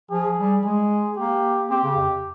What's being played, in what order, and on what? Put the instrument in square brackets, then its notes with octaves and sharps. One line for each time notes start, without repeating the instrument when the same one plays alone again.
[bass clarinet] F3 [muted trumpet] G#4
[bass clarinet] G3
[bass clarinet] G#3 [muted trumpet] G#4
[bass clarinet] A#3 [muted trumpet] G4
[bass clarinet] C4 [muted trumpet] G4
[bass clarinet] C#3
F2